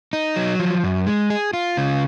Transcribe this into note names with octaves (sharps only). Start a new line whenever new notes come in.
D#4
F#3
F3
F#2
G#3
G#4
F4
C#3